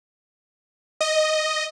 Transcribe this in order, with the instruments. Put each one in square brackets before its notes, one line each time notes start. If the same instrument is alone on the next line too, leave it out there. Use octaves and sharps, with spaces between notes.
[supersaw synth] D#5